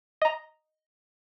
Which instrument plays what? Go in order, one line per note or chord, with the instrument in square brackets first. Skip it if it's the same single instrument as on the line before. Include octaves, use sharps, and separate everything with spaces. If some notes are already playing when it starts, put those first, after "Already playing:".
[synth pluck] D#5 A#5